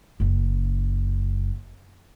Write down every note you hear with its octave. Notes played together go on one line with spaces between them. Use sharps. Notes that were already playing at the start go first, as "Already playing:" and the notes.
F#1 F#2